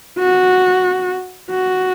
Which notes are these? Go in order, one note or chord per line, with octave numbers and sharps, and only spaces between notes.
F#4
F#4